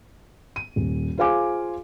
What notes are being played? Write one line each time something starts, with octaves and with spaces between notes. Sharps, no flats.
D#7
D#1
F4 G#4 C5 F5 G#5 D6